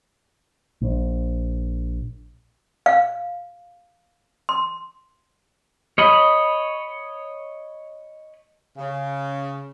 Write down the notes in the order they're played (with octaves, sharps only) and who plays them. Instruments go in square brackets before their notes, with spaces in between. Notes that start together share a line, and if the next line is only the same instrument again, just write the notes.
[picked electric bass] A#1
[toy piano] F5
C6
[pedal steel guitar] C#5 D#5 B5
[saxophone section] C#3